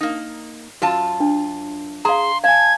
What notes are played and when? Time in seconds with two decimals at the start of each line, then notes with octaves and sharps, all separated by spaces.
0.01 A#3 D#4
0.82 F#2 F4 F#4 A5
1.20 D4
2.05 G#4 F5 A#5 C6
2.44 F5 G#5 A5 G#6